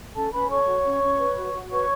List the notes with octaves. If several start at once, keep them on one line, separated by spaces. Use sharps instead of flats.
C#4 A4 A5
C#4 B4 B5
A4 C#5 C#6
F#4
C#4
C#4
B4
F#4
F#4
B4 C#5 C#6